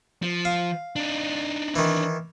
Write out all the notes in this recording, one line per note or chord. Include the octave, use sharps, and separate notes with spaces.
F3
F5
D4 D#4
D#3 E3